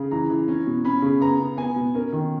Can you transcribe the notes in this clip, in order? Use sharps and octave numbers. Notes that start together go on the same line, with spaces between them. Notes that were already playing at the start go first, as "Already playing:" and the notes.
Already playing: C#3
E3 A#5
E3
C#4
B2
C#4 B5
C#3
B3 A#5
C#3
B3 G#5
B2
C#4 A#4
D#3